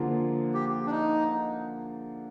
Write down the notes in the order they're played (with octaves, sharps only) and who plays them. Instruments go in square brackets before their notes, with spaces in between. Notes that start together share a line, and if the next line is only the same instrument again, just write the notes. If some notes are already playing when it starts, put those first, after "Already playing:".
Already playing: [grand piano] D3 F3 A#3 F4 G#4
[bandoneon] G4
D4
D#4